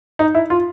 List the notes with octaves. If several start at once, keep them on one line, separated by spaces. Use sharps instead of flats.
D#4
E4
F4